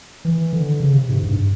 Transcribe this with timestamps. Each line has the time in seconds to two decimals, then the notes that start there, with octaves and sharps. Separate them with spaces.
0.25 E3
0.53 D3
0.80 C#3
0.95 C3
1.09 G#2
1.23 G2